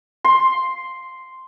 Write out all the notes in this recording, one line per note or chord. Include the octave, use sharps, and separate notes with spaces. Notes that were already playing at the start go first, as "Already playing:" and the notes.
C6